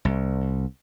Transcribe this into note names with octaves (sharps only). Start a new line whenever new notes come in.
C2